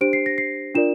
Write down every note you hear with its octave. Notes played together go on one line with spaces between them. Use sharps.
D4 G4 C5 D7
C7
A#6
C7
D4 F4 A#4 D5 E7